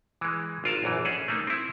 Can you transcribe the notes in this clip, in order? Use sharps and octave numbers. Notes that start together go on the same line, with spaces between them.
E3 G#3
G#1 F4 A#4 A5
A#1 F#2 E3
C#4 G#4 A4
A3 A#3 D#4
C4 E4